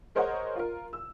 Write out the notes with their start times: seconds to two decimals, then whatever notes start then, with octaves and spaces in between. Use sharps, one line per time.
0.15 G#4 A#4 C5 C#5 D#5 F#5
0.56 F4 A#4
0.93 E6